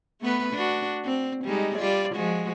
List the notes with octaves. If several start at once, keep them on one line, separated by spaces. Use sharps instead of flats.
A3 B3 B4
D4 F#4
C4
G3 G#3 D#4
G3 F4 D5
F3 G#3 F#4